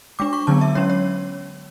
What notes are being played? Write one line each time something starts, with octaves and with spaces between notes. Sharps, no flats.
G#3 D4 D6
C#6
D3 F#3 B3 A5
E5
F#3 C#4 C#5
C#5